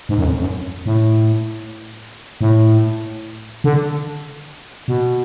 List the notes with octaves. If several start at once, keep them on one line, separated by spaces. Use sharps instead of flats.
G#2
F#2
F2
F#2
A2
A2
D3
B2